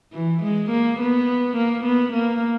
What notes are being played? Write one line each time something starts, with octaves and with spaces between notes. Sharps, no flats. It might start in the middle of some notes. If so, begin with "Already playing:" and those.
E3
G#3
A#3
B3
A#3
B3
A#3